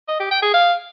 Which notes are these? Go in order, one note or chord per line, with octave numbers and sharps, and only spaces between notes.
D#5
G4
G5
G#4
F5